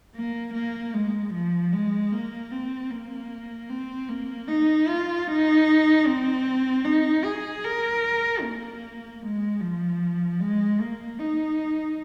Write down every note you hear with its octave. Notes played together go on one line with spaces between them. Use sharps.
A#3
A#3
G#3
F3
G#3
A#3
C4
A#3
C4
A#3
D#4
F4
D#4
C4
D#4
G#4
A#4
A#3
G#3
F3
G#3
A#3
D#4